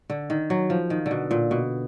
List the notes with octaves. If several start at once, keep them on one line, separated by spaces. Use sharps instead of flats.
D3
D#3
F#3
F3
D#3
D3
B2
A#2
B2